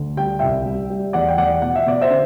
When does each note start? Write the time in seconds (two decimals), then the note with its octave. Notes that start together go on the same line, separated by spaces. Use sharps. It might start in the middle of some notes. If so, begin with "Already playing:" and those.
Already playing: D2
0.17 G3 G5
0.39 C2 E5 G5
0.66 G3
0.90 G3
1.13 E2 D5 F#5
1.28 G5
1.38 E2 D5 F#5
1.62 B2 F#5
1.76 E5
1.86 B2 D5
2.01 C5 E5
2.10 D3